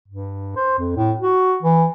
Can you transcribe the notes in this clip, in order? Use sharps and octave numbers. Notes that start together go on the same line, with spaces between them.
G2
C5
F2
A2
F#4
E3